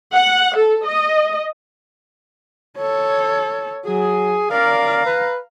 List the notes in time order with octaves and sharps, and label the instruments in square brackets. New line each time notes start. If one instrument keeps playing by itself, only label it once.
[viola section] F#5
A4
D#5
[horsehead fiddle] A4 C#5
[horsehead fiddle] F#3 [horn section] G#4
[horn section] C#4 A#4 D5 [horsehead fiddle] F5 A#5
[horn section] B4